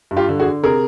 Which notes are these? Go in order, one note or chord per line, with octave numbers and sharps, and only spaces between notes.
G2
F4 G4
D3
F#4 G#4
D3
C3 G#4 A#4